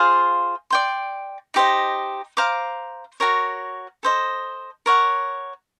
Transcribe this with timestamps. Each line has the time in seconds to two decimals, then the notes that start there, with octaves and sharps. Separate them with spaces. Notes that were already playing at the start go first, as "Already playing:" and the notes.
Already playing: F4 G#4 C5 F5
0.70 D5 G5 C6
1.54 D#4 G4 C5 D#5
2.37 C5 F5 A#5 D6
3.20 F#4 A#4 C#5
4.03 A4 C5 D#5
4.86 A#4 C#5 F#5